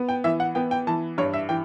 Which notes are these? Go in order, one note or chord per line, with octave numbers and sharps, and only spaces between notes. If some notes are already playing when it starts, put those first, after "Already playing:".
Already playing: B3
G5
E3 E5
F#5
B3 G5
G5
E3 A5
G2 C#5
E5
E3 G5